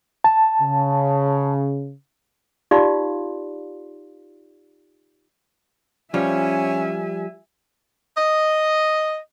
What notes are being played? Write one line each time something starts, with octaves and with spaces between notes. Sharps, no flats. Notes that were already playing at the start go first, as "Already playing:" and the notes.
A5
C#3
D#4 F4 G4 D5 F5 C6
F3 G3 C#4 F4 E5 G#5
D#5